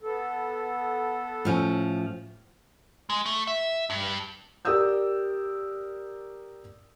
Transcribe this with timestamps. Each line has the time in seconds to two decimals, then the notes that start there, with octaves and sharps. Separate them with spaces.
0.03 B3 A4
1.45 A2 F3 C#4
3.10 G#3
3.26 A3
3.47 E5
3.90 G2
4.65 G4 A#4 D5 D#6 E6 G6